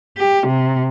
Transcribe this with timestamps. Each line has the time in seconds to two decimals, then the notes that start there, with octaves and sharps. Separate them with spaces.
0.17 G4
0.47 C3